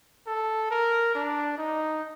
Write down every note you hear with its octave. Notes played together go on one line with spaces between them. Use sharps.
A4
A#4
D4
D#4